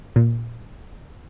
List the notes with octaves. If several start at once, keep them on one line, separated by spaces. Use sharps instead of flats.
A#2